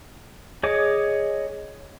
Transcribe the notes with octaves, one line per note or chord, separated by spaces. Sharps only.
G#4 C#5 D#5 D6